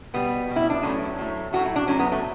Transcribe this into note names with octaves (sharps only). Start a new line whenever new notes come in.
B2 G3 B3
B2 G3
E4
D4
A2 F#3 A3 C#4
A2 F#3 A3
A2 F#3 A3 F#4
E4
D4
A2 F#3 A3 C#4
B3
A3